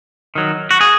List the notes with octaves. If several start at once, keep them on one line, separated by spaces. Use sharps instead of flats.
D#3 F#3
F#4
G#4